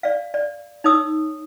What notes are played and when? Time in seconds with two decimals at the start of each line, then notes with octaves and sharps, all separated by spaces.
0.03 D5 F5
0.34 D5
0.84 D#4 C#5 D#6 E6